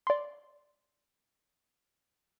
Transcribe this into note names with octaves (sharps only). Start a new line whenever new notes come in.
D5 C6